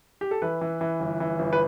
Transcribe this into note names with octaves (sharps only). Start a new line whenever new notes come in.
G4
A4
E3 B4
E3
E3
G1
E3
G1
B4